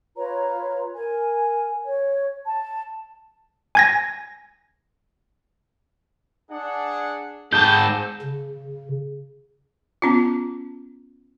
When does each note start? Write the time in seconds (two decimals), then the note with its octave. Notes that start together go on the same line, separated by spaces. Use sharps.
0.16 F4 B4 C#5 A#5
0.95 A#4 G#5
1.85 C#5
2.46 A5
3.75 G#5 G#6 A#6
6.51 D4 G#4 F#5
7.52 G#2 G#4 A4 A5 G6
8.22 C#3
10.02 B3 C#4 F4